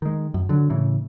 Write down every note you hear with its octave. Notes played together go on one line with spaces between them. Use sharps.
D#3 G#3
F#2
D3 F#3
A2 C#3 E3